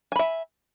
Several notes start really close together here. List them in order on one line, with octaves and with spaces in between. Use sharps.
G#5 B5 E5